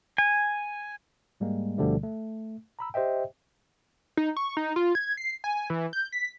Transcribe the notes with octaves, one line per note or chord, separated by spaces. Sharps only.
G#5
G#2 G3 G#3 A#3
D2 B2 D3 F3 G3 A3
A3
A#5 B5 E6
G4 C5 D#5 E5 G5
D#4
C#6
D#4
F4
G#6
C7
G#5
E3
G6
B6